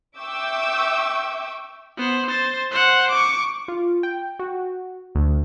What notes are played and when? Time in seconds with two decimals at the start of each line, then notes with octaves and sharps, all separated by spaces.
0.17 E5 G5 C#6 D6 E6 G6
1.97 B3 C5
2.28 C5 A6
2.71 C5 F#5
3.11 C#6 D6
3.68 F4
4.03 G5
4.39 F#4
5.15 D2